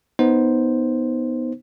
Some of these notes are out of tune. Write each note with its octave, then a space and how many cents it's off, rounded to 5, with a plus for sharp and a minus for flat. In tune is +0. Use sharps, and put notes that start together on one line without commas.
B3 +0 D#4 +10 C5 +0